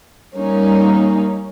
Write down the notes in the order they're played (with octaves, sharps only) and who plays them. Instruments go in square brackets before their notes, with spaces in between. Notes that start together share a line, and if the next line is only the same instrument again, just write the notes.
[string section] G3 A#3 C#4 D#4